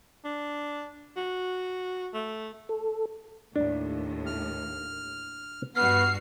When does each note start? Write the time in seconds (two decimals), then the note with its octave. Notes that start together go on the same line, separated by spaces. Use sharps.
0.24 D4
1.16 F#4
2.13 A3
2.69 A4
3.56 D#2 A2 D4
4.26 F6
5.76 G2 B3 F#4 F6 C7